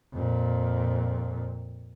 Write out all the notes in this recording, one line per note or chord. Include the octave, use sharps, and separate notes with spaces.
F2 A#2